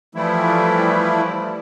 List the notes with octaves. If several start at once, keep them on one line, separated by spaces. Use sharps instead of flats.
E3 F3 G3 A3 E4